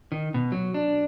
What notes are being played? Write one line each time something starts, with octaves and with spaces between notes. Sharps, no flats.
D#3
B2
F#3
D4